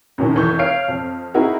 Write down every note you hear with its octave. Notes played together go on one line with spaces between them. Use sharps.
F#2 A2 D#3
F1 E3 C#6 G6
C#5 F5 F6 C7 D7
F2
C4 D#4 E4 F#4 G#4 A#4